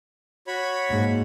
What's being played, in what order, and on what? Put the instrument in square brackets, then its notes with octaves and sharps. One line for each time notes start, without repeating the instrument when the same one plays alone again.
[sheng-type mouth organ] F#4 C#5 B5
[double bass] G#2 [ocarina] A#3